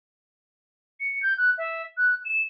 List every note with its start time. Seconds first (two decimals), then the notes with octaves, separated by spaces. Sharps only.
1.00 C#7
1.23 G6
1.38 F#6
1.58 E5
1.97 F#6
2.25 E7